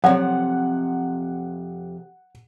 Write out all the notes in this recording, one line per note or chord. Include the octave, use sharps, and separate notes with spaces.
F2 C3 F#3 C#5 D5 F#5